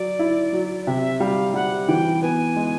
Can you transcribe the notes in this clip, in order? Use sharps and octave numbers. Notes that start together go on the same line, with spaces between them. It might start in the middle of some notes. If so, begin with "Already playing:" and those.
Already playing: F#3 D5
E4
F#3
C3 E5
G3 F5
G3 F#5
E3 G5
B3 G#5
G#3